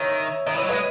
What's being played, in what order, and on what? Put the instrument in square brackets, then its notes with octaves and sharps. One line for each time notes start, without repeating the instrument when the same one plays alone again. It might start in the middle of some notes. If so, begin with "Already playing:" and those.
Already playing: [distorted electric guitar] D#3 [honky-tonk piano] C#5 E5
[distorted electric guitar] D#3 [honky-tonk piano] D#5
[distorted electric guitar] E3
[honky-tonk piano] C#5
[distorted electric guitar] F#3
[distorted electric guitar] G#3 [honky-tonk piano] B4 D#5